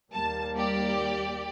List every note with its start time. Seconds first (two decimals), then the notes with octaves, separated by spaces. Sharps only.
0.12 D#2 G3 A#3 A5
0.56 G4 D5